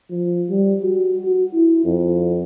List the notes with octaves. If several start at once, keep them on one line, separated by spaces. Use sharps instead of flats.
F3
G3
F#4
F#4
E4
F2